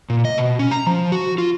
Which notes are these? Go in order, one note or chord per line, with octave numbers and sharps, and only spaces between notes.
A#2
D#5
B2
C#4
A#5
F3
F#4
F4